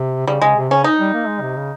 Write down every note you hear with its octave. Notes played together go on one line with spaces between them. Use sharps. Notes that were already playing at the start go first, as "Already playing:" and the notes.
Already playing: C3
C#3 G3
C#3 G#3
C3
C#3 C#4
D#4
G3
A#3
G#3
C3
C#3